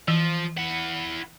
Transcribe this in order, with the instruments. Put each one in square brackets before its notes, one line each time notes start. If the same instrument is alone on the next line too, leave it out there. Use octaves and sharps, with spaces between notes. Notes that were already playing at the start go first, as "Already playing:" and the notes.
[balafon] E3 [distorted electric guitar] F3
[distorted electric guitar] E4 F#5